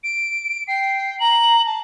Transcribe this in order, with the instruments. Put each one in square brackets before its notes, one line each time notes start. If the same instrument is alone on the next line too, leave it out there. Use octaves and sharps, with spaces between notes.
[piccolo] D7
[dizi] G5 [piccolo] C7
[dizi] A#5 [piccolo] F#7
[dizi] A5